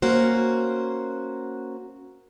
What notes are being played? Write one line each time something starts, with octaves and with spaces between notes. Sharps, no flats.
A#3 C#4 F#4 C5